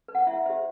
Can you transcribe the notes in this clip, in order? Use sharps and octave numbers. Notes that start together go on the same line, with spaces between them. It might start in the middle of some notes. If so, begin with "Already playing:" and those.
B4
F#5
E4 E5
G4 C5 E5